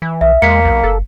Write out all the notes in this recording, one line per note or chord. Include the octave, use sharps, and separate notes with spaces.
E3
B1 E5
E2 G#3 A#3 B6 C#7
B1
F#1 A4